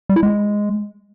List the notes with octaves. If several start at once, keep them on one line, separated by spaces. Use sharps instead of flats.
G3
E4
G#3